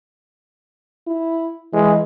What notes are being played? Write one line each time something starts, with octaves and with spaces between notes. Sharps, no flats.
E4
E3 G#3